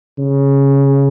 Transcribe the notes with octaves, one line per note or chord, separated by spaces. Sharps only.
C#3